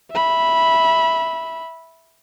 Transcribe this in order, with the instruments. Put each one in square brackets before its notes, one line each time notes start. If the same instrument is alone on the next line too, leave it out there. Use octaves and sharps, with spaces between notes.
[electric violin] E5 B5